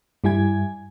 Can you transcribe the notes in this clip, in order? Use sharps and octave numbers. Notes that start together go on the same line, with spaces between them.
G2 G3 E4 G#5 G#6